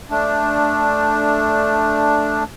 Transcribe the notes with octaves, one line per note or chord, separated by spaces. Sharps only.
A3 D4